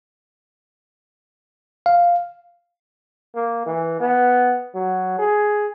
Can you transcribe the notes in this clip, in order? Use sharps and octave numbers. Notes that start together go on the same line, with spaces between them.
F5
A#3
E3
B3
F#3
G#4